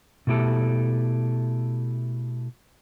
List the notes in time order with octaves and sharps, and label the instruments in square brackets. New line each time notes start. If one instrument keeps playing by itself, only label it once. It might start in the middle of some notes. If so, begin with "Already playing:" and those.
[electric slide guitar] B2 A3 E4 G4 A4